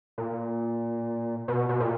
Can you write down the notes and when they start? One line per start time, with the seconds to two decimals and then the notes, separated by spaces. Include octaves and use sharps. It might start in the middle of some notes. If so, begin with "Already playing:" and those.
0.18 A#2
1.48 B2
1.69 B2
1.80 A#2